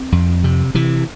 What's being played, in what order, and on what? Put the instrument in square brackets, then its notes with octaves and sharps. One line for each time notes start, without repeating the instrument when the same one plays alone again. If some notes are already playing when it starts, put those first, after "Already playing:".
Already playing: [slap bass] C4
F2
C3
C3 E3